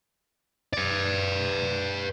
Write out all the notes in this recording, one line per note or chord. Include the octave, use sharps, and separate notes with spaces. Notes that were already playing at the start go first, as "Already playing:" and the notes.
B4 D5